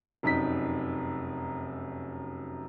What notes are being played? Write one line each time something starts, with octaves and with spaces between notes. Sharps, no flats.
F1 F#2 D#4 B6